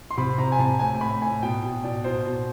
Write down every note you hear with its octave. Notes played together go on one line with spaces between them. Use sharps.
C6
C3 B5
C3 A#5
G#5
C3 A5
A2 G#5
A2 B5
A2 G#5
B2 G5
B2
B2 D5
B2 C5
B2